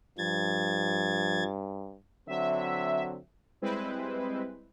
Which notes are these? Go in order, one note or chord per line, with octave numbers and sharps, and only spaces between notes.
G2 F3 G#6 A6
D3 F#3 C4 E5
G3 G#3 C4 E4 B4 C5